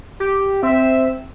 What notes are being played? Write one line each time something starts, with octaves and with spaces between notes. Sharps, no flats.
G4
C4 E5